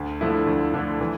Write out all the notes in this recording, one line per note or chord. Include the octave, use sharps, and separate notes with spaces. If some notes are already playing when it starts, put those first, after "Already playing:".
Already playing: D2
D3 F3 A3 E4
D2
D3 F3 A3 E4
E3